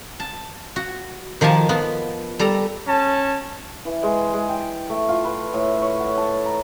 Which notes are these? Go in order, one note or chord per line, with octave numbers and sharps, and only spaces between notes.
A5
F#4
D#3 F3 G4 G#5 A5
F3 B3
G3 A4 A#5
C#4 A5
E3
G#3
G#3
G5
A3
F4
B4
A2
C#5
F#5
A5
A#5